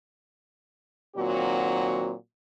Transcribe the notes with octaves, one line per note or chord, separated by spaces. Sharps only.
A#2 D#3 F#3 C4 F#4